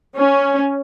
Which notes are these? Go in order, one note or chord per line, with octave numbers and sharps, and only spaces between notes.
C#4